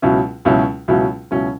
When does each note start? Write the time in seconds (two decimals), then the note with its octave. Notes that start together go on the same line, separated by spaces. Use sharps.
0.02 C#2 B2 F#3 C#4 E4
0.45 C#2 B2 F#3 C#4 E4
0.88 C#2 B2 F#3 C#4 E4
1.31 C#2 B2 F#3 C#4 E4